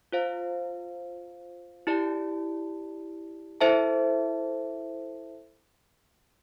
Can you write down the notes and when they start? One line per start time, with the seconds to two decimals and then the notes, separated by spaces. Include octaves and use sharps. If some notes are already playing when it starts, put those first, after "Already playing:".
0.12 F4 C5 F5
1.87 E4 G4 D5 A5
3.61 E4 A4 C5 E5 A5